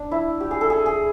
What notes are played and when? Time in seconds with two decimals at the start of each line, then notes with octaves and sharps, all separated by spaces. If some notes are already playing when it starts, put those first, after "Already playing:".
Already playing: D4
0.11 E4
0.40 G4
0.51 G#4
0.61 A4
0.70 G#4
0.86 G#4